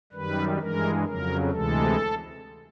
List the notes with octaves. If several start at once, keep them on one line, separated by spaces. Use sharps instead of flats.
F#2 D#3 G3 B4
G2 E3 G#3 A#4
F2 C#3 F#3 A#4
D2 C3 E3 G#3 A4